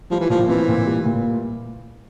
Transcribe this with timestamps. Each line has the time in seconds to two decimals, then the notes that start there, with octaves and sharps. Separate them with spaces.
0.11 F3 G3
0.21 E3
0.29 A#2 F3
0.49 E3 C4
0.68 A#2
0.87 G3
1.05 A#2